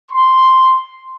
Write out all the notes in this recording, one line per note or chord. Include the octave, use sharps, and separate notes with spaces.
C6